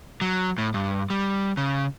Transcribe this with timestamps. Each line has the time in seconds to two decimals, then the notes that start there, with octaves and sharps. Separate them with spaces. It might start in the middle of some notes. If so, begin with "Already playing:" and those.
0.21 F#3
0.58 A2
0.74 G2
1.10 G3
1.57 C#3